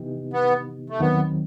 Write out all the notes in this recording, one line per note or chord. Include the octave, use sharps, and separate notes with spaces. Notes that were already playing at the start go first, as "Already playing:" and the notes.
Already playing: C3 E3 B3 D#4 G4
B3
A3
D#2 D#3 F#3 B3 C4